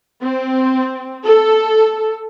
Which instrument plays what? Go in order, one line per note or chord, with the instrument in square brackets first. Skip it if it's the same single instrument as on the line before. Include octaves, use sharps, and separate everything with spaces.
[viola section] C4
A4